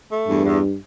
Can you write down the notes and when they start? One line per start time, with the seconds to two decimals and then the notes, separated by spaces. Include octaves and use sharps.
0.10 A3
0.27 E2 G2
0.45 E2